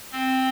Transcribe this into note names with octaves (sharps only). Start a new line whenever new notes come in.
C4